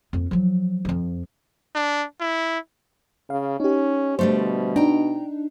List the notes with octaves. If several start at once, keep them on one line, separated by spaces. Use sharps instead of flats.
F2 A#3
F3 F#3
F2 F3
D4
E4
C#3 F5
C#4 D#4 G4
B2 D3 G3 A3 C5
D4 D#4 G5 A#5